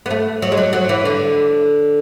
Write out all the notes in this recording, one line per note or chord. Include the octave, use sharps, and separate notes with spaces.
B3
A3
F#3
G#3
F#3
F#3
E3
D3